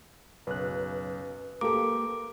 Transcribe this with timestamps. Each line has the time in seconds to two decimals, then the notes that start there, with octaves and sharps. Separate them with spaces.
0.47 B1 F#2 C#3 B4 F#6
1.61 A#3 G4 A4 A#5 D6